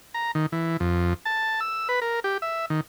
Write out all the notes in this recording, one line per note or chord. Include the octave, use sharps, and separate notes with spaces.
A#5
D#3
E3
F2
A5
E6
B4
A#4
G4
E5
D#3